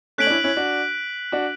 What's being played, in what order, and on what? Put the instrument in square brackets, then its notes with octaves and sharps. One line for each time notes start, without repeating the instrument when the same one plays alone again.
[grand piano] A3 C#4 [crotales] F#6 B6 D7 F#7
[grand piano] D4
C#4 E4
C#4 E4
D4 F#4
D4 F#4